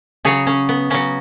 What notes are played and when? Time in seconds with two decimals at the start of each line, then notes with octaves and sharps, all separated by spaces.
0.25 C#3 F#3 G#4 C#5
0.47 C#4
0.69 B3
0.90 C#3 F#3 C#4